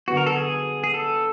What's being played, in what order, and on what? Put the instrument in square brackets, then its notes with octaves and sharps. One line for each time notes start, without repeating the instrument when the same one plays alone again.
[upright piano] D3 F#3 B3 [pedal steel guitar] F#4
[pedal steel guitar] A#4
A4
G#4
G#4
A4